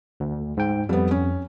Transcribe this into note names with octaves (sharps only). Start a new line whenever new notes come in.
D2
G#2 G5
F2 G3 B3
C#4